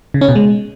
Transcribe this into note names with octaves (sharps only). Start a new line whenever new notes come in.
C#3
C#4
B2
G#3